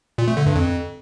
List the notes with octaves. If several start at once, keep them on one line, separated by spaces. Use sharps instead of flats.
A#2
A3
D3
G2
F2